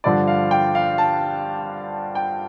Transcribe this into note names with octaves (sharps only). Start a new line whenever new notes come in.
G2 D3 F3 D5
F5
G5
F5
A5
G5